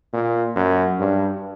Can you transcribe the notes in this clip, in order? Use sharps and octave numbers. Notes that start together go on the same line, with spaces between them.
A#2
F#2
G2